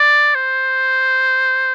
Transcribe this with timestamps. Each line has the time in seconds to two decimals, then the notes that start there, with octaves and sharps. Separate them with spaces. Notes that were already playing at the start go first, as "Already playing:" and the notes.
Already playing: D5
0.35 C5